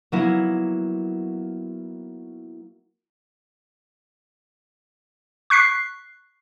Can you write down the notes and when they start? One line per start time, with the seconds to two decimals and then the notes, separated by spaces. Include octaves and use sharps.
0.12 F#3 A#3 B3 E4
5.50 C#6 F#6 B6 C7